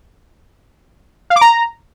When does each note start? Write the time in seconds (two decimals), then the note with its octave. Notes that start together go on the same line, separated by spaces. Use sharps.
1.30 F5
1.36 D6
1.41 A#5